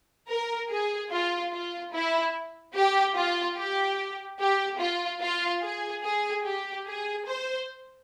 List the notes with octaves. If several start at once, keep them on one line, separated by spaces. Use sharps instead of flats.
A#4
G#4
F4
F4
E4
G4
F4
G4
G4
F4
F4
G#4
G#4
G4
G#4
C5